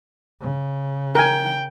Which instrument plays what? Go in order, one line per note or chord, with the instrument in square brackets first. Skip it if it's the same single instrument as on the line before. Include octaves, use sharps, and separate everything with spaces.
[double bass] C#3
[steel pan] A#4 G#5 [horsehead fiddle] G5